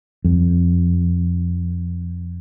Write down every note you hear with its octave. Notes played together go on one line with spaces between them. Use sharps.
F2